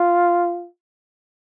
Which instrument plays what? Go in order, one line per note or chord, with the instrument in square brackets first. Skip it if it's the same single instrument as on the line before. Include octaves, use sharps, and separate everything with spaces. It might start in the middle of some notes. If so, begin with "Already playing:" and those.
Already playing: [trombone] F4